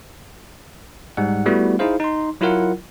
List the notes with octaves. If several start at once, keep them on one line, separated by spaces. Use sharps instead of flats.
G#2 G3 G#3 F#5
G3 A3 B3 E4 F#4
D#4 E4 G#4 C5 F5
D#4 C6
F#3 E4 F4 A#4 F#5